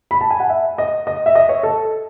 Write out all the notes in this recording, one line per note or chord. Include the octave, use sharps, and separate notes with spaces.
B5
A5
G#5
F#5
E5
D#5
D#5
E5
D#5
C#5
A4